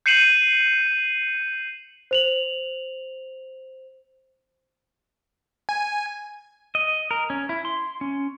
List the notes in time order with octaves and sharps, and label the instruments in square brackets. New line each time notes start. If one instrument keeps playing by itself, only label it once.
[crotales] G6 C7 C#7 D#7 E7 F#7
[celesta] C5 F7 F#7
[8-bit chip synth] G#5
[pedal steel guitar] D#5
A#4
C#4
E4
C6
C#4